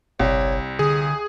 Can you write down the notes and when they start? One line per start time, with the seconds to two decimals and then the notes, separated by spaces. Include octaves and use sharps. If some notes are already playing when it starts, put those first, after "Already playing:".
0.19 G1 C2 C#5
0.79 D3 G#4 D#6